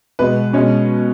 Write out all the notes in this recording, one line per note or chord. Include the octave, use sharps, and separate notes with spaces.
B2 G#3 B3 B4
B2 G#3 C#4